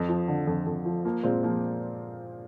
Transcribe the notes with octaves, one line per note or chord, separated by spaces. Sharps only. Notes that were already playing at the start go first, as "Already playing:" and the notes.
Already playing: F2
F3
D3
F2
F2
F3
F3 A#3
A#2 G#3 C4
F3 A#3